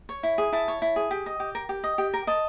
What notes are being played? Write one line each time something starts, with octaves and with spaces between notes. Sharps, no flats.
C#5
E4
G#4
E4 A5
C#5
E4
G#4
G4
D#5
G4
A#4
G4
D#5
G4
A#4
D#5 A5